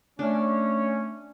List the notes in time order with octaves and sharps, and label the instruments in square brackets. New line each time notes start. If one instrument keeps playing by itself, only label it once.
[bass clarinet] A3 [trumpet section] C#4 [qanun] D4